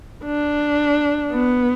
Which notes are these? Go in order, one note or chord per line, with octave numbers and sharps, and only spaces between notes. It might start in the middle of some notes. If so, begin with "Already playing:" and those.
D4
B3